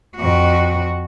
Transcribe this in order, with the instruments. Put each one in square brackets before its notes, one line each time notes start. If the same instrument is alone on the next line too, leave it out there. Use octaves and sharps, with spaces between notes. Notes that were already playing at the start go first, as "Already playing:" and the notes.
[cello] F2 F#4